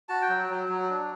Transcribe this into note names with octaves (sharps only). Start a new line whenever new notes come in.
F#4 A5
G5
F#3
F#3
F#3
D4